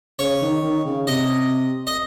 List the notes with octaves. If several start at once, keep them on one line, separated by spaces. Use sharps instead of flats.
C#3 C#5
D#3
D#3
C#3
C3 D#5
D#5